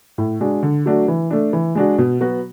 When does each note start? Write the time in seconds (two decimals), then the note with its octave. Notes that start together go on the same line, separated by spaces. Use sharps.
0.18 A2
0.41 G#3 D4 F#4
0.63 D3
0.86 F#3 A3 D4 F#4
1.08 E3
1.31 A3 D4
1.53 E3
1.75 G#3 D4 F#4
1.98 B2
2.21 F#3 B3 F#4